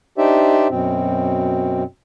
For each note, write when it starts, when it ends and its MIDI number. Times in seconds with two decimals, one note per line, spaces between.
0.18 0.67 62
0.18 0.67 63
0.18 0.67 67
0.18 0.67 72
0.18 0.67 74
0.18 0.67 76
0.69 1.83 42
0.69 1.83 47
0.69 1.83 60